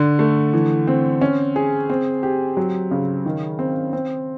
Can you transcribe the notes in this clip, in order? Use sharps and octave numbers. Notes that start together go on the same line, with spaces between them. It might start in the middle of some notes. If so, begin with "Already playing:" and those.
Already playing: D3
A3
E3
C4
C#4
G#4
C4
G4
F#3
C#3
D#3
C4
C4